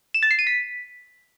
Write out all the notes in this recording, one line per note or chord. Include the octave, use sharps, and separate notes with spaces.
E7
A6
C7
D#7
B6